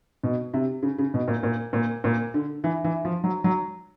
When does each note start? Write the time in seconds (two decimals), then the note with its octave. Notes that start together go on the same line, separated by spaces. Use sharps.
0.23 B2
0.54 C3
0.83 C#3
0.98 C#3
1.14 B2
1.28 A#2
1.43 A#2
1.73 A#2
2.04 A#2
2.34 D3
2.64 E3
2.84 E3
3.05 F3
3.24 F#3
3.44 F#3